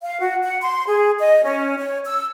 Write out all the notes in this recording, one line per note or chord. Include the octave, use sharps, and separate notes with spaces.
F5
F#4
F#5
C6
G#4
D#5
C#4
C#5
E6